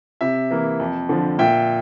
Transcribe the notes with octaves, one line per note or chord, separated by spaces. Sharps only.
C3 E5
E3 A#3
F2
D3 F3
A#2 E5 G5